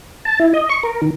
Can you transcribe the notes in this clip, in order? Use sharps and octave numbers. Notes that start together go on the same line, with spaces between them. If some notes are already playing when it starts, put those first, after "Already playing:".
A5
E4
D#5
C#6
A#4
D#3